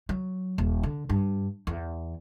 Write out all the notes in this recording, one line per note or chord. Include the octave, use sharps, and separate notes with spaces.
F#3
D#1
D3
G2
E2